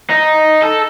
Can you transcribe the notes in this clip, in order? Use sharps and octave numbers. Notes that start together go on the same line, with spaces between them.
D#4
A4